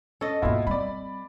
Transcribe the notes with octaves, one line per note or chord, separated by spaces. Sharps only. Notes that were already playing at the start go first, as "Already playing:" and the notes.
C#4 A4 D#5
G#2 B2 A#3 E4 F4
G3 C4 D5 B5